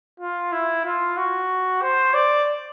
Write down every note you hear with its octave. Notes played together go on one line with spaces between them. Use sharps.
F4
E4
F4
F#4
C5
D5